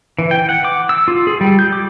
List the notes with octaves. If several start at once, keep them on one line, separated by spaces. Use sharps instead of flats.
E3
G5
F#5
D6
E6
F4
G#4
G3
G6
D6